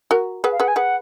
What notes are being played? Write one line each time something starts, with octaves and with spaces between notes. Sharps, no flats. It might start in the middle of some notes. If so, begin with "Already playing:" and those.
F#4 A#4
G#4 B4 F#5
F5
G#4 B4 F#5
G#5
G#4 B4 F#5